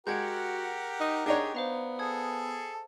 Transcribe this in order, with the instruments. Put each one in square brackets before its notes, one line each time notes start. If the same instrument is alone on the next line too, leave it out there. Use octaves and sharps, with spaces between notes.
[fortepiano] G#3 [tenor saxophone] F#4 [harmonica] G4 A#4 F#5 [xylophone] G6 G#6 D7
[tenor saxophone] D#4
[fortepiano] D4 D#4 C#5 [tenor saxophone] G#4
[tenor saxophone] B3 [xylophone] C5 F5 A#5
[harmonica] G#4 A4 [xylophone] D#6 G#6